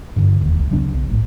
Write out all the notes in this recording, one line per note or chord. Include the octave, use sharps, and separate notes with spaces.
G2 D3 E3
E1 D#2
C#2
C#3 F#3 B3 D4
B1
G#1 A2